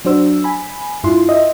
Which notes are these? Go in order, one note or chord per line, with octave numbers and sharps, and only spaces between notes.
F#3 D4 F#4 C5 E6
G#5 B5
G2 E4 F4 C6
D#5 E5